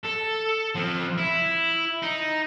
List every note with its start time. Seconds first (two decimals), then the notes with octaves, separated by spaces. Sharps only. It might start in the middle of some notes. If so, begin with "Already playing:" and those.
0.05 A4
0.75 F3 C4
1.18 E4
2.02 D#4